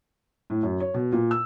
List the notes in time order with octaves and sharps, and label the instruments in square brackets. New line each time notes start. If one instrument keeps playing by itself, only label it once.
[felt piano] A2
F#2
C#5
B2
A#2
E6